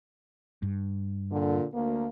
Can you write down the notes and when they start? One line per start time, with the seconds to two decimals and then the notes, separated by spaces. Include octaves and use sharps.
0.62 G2
1.31 A#2 D3
1.74 D2 A#3